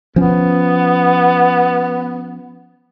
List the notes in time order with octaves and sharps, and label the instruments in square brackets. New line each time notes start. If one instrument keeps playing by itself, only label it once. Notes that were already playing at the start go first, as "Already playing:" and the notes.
[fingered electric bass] F3 C#4 [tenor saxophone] B3